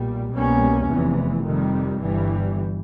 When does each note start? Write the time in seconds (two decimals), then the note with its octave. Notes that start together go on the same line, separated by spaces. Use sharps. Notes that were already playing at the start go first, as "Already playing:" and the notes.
Already playing: B1 A#2 G3
0.32 C2 B2 G3 A#3 C#4
0.89 F1 E2 C3 E3
1.45 F2 C3 D#3 G3
2.01 G1 G2 E3 G3